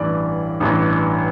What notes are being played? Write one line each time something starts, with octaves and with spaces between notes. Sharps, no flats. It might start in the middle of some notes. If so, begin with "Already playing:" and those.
Already playing: A1 G2 E3 D5
A1 G2 E3